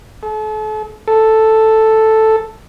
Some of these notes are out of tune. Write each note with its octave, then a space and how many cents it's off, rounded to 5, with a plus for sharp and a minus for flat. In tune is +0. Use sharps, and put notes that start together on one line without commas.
A4 -40
A4 +0